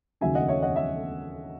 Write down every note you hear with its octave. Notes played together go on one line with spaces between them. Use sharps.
D#2 C#3 F#3 C#4 E5 G#5
D#5 F#5
C#5 E5
D#5 F#5
E5